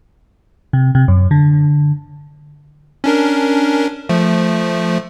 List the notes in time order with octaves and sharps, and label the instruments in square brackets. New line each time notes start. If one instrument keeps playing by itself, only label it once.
[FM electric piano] C3
C3
F#2
D3
[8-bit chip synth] C#4 D4 A#4
F3 A3